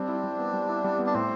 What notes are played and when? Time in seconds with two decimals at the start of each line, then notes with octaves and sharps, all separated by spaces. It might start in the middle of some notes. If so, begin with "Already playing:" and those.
Already playing: G3 C4 D4
0.09 E4
0.24 G3
0.39 B3
0.54 G3
0.69 E4
0.84 G3
0.99 B3
1.07 D4
1.15 A2 C4